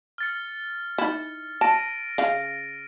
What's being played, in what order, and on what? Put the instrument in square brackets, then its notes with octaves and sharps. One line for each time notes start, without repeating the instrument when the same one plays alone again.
[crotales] F6 A6 C#7
[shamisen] D#4 E4
[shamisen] A5 [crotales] A#6 D7 D#7
[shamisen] C#3 F5